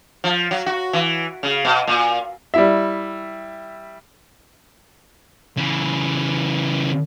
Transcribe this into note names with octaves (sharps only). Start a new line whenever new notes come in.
F3
F#3
F#4
E3
C#3
B2
A#2
G3 E4 E5
C#3 E3